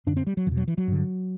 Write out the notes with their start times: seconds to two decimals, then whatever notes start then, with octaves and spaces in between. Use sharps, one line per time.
0.07 F#2 D3 D4
0.17 C4
0.27 G3
0.37 F#3
0.47 E2 B2 E3
0.57 F#3
0.68 E3
0.78 F#3
0.88 G2 D3